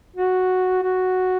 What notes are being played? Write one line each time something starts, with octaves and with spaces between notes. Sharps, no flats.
F#4
F#4